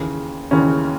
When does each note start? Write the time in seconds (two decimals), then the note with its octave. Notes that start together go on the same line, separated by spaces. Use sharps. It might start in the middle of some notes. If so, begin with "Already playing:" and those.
Already playing: D#2 C#3 E3
0.51 D#2 C#3 E3 C#4